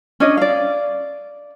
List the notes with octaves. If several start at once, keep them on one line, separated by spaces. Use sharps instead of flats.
C#4 D4 D#5
D5 F5